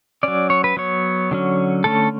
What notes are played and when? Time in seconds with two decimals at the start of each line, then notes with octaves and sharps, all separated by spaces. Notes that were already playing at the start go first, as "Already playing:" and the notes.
0.23 F#3 C#4 D5
0.50 C#5
0.64 B4
0.77 F#3 B3 C#5
1.31 D3 F#3 C#4
1.84 D3 A3 C#4 A4